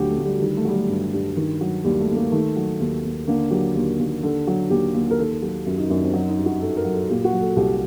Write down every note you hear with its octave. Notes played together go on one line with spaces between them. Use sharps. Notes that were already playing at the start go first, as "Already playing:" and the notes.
Already playing: D2 D3 F#3 F#4 G4
A3
D2
G3
D#3 G3
A3
F#3 G3
A3
G2
G2
D#3
F#3
D#2 G3
A3
D#2
A#3
D#3 A3
F#3
D#2
D#2
D3 A#3
F#3 G4
D#2
D#2
D3 A4
F#3
D#2 G4
D#2
A#4
D#3 A4
A4
F#3 G4
F#2
D#4
F#2 D4
C4
F#3 D#4
D#4
G2
F#4
G2 A4
A#4
F#3
A4
A#2 G4
F#4
F#3
A4
C2 G4